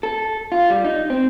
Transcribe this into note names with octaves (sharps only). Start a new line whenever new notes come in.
A4
F4
G3
D#4
C4